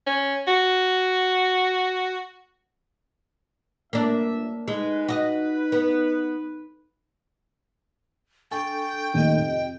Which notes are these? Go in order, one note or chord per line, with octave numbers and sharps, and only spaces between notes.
C#4
F#4
G1 A#3 D4 E5
G#3 D#4 B4
F#4 D#5
B3
D4 A4 G5 G#5 C#6
D#2 D#3 A3 G4 D#5
F2 C3